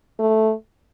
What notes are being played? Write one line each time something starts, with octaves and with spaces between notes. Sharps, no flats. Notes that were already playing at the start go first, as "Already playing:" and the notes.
A3